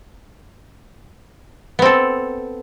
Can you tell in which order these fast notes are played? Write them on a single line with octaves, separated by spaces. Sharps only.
B3 C4 A4